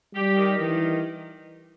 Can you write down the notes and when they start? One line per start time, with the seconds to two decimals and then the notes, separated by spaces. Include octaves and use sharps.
0.15 G3 G4
0.36 D#3
0.58 D#3 E3